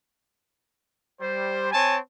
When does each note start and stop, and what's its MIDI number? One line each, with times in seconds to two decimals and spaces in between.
1.21 1.71 55
1.21 1.71 72
1.72 1.98 60
1.72 1.98 73
1.72 1.98 80
1.72 1.98 81